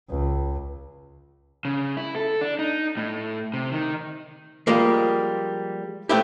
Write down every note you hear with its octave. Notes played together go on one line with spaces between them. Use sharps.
C#2
C#3
E4
A4
D4
D#4
A2
C3
D#3
F3 G3 G#3 A#3
A3 B3 C4 E4 G4